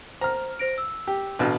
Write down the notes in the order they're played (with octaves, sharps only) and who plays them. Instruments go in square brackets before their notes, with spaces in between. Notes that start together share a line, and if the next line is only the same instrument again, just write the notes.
[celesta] C5 [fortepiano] A#5 F6
[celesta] C5 A#6 D7
E6
[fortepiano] G4
[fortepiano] A1 B2 [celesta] D4